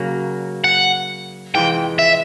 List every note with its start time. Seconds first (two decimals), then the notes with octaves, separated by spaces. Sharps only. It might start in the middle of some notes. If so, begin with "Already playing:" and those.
Already playing: C#3 F#3 A#3
0.64 F#5
1.54 F2 C3 E3 G#3 G5
1.99 E5